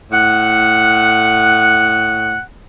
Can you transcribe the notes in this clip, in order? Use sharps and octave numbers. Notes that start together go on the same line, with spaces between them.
A2 F#5